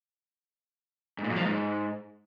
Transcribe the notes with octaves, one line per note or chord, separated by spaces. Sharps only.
G#2
A#2
F#2
F3
G#2